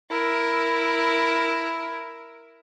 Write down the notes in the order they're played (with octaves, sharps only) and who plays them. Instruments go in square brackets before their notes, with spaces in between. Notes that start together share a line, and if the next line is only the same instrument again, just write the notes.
[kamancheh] E4 A#4